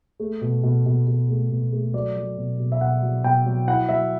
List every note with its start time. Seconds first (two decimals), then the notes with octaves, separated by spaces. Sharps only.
0.20 A3
0.41 B2
0.63 B2
0.86 B2
1.07 B2
1.29 A3
1.51 B2
1.73 A3
1.93 F#3 D5
2.16 F#3
2.37 B2
2.59 B2
2.72 E5
2.80 B2 F#5
3.02 F#3
3.23 B2 G5
3.45 F#3
3.67 E4 F#5
3.89 F#3 E5